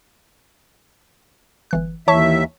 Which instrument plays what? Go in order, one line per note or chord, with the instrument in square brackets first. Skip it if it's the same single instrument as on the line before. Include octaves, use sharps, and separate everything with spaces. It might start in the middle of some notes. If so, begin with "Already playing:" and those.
[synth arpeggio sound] G1 E3 F#6
[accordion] D#2 E5 [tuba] E3 [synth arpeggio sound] C#5 A5 C#6